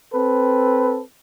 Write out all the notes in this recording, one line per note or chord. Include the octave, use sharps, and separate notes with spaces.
C4 A4 B4